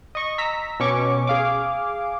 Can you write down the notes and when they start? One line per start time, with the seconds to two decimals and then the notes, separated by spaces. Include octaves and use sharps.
0.15 D#5 C#6
0.38 A#5 E6 B6
0.80 B2 C#4 C#6 D6
1.27 G#4 F5 D6